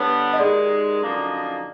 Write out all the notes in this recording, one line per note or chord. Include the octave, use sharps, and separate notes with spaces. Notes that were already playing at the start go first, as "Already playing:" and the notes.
Already playing: D3 G3 B3 C#5
D#5
D#2 D#3 G#3 D5
F#2 D3 F3 A#3 D#4